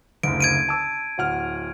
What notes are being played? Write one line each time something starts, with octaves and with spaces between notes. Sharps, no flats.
F#1 D2 D7
G#6 D7 D#7
A5 E6
D1 F#5 F6